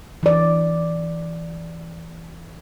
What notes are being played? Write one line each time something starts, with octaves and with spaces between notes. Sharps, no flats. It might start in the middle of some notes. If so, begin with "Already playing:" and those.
E3 D5